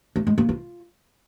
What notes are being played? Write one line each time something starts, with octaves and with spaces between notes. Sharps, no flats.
A3
G#3
A#3
F4